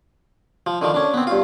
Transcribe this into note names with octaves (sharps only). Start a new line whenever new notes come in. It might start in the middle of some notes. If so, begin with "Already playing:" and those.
F3
D3 D#3 F3
C#4 D4
B3 C4
G2 F4